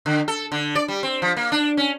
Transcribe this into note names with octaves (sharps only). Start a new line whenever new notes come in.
D3
A4
D3
D5
G3
C4
F3
A#3
D4
C#4